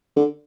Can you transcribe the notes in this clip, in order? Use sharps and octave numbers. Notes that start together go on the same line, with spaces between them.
D3